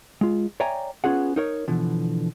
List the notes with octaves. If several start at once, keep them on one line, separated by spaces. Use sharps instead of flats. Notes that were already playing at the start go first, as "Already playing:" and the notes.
G#3 F4
C#5 D5 E5 G5 G#5 A#5
B3 C#4 F4 G#4 F#5
D#4 A#4 C#5
B2 D3 E3 F3